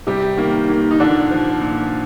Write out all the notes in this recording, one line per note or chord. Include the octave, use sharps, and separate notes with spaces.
C3 G3 G4
D#3 A#3
D#3 A#3
D#4
A#2 D3 D4
F3
A#2